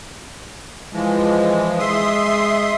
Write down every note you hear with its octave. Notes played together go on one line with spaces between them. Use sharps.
E3 F3 G#3
G#3 E5 C6 D#6